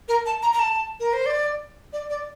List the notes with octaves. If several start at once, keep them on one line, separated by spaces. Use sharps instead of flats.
A#4
A5
A#5
A#5
A5
A#4
C5
D5
D5
D5